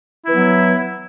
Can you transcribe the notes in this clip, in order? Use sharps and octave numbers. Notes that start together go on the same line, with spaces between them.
E3 F#3 B3 E4